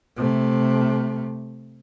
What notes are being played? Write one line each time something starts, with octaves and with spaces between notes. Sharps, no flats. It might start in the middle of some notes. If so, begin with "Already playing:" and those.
C3 A3